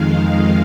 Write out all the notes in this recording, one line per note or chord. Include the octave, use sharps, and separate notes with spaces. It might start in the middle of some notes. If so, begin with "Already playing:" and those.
Already playing: F2 D#3 G#3 F5